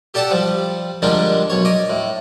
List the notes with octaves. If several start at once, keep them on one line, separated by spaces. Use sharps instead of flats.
G4 A4 D5 F#5 G5 A5
F3 G3
D3 F3 G3 G#3 A#3 D4
B1 C#5
D5 D#5
A2